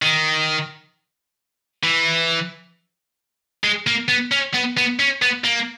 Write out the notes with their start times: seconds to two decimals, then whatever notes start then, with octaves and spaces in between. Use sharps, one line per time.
0.02 D#3
1.84 E3
3.64 G#3
3.87 A#3
4.08 B3
4.31 C#4
4.54 B3
4.77 B3
4.99 C#4
5.22 B3
5.44 A#3